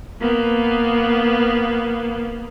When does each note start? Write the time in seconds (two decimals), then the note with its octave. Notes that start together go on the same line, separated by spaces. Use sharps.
0.21 A#3 B3